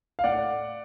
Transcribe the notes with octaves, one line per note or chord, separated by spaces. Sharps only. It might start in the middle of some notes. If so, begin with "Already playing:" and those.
F5
A2 D5 F#5